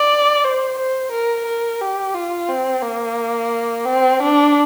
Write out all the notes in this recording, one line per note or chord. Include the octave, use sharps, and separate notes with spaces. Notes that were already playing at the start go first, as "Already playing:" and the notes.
Already playing: D5
C5
C5
A#4
A#4
G4
F4
C4
A#3
C4
D4